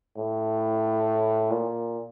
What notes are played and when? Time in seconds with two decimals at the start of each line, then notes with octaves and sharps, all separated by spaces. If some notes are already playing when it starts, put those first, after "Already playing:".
0.18 A2
1.51 A#2